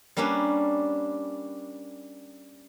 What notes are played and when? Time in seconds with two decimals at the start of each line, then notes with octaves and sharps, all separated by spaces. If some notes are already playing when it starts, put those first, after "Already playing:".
0.17 G3 A#3 C#4 D4 B4